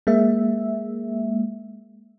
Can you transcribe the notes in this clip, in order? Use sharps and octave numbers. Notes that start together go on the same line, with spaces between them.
G#3 A#3 E5